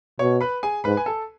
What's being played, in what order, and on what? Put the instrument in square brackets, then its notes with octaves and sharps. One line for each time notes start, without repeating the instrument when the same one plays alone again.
[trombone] B2 [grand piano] C#5 C#6
[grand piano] B4 B5
G#4 G#5
[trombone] G#2 [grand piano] B4 B5
[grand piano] G#5
A4 A5